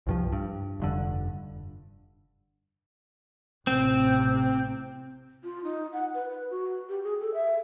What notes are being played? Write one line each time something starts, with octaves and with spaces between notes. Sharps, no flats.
C2 G2 F3
G2
F1 G2 D3
A1 C3 C4
F4
D#4
F#5
B4
B4
F#4
G4
G#4
A4
E5